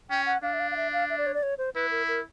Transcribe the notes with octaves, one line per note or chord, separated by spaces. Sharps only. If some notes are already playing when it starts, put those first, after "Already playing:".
C#4 G5
F#5
D4 F5
E5
F5
F5
E5
F5
E5
D5
C#5
D5
C#5
C5
E4 B4
A#4
A#4